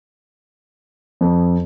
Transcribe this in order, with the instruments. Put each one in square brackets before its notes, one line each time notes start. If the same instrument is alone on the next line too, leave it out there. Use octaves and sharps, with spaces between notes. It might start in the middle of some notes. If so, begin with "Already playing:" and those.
[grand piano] F2